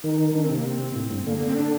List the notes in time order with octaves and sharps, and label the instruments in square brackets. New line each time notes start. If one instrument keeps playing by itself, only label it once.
[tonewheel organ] D#3 [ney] D#4
[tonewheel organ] D#3 [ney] D4
[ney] C4
[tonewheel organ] C3
[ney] A#3
C4
[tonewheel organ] A2
G2
[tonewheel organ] D3 [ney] A#3
[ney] A#3
C4
D4